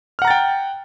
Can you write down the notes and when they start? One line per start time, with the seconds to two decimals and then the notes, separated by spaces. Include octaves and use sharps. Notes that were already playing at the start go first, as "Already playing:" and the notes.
0.19 F6
0.22 F#5
0.25 A#5
0.28 A6
0.30 G5